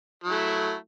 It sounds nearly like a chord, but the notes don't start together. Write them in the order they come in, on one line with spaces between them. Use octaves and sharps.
F#3 E4 A3